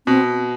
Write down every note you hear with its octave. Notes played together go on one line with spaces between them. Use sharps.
B2 C4